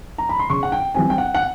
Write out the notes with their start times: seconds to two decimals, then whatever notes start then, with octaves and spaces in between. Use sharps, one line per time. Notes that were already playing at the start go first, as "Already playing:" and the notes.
0.18 A#5
0.29 B5
0.39 C6
0.50 C#3 C#6
0.63 F#5
0.72 G5
0.95 E3 G3 C4 G#5
1.10 G5
1.18 F#5
1.35 F#5